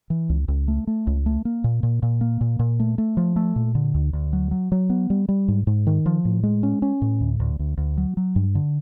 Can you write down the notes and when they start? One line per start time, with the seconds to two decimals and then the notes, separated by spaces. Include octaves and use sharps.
0.10 E3
0.29 C#2
0.48 C#2
0.68 A3
0.87 A3
1.07 C#2
1.26 A3
1.45 A#3
1.64 A#2
1.83 A#2
2.02 A#2
2.21 A#3
2.41 A#2
2.59 A#2
2.80 A3
2.98 A3
3.17 F3
3.36 A3
3.56 A#2
3.75 D3
3.94 D2
4.13 D2
4.33 F#3
4.51 F#3
4.72 F#3
4.90 B3
5.10 G3
5.29 G3
5.48 G#2
5.67 G#2
5.87 D#3
6.06 F3
6.25 A2
6.43 G#3
6.63 C#4
6.82 C#4
7.02 A2
7.21 D2
7.40 D2
7.59 D2
7.78 D2
7.98 F#3
8.17 F#3
8.36 G2
8.55 D3